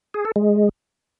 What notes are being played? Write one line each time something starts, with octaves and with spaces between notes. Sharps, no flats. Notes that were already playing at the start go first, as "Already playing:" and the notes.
G#4
A4
G#3